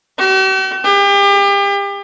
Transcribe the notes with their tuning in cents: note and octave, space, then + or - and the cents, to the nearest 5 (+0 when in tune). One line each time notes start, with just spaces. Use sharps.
G4 -45
G4 +35